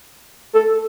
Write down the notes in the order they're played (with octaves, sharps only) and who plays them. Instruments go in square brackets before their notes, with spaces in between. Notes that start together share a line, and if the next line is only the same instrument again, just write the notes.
[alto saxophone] A4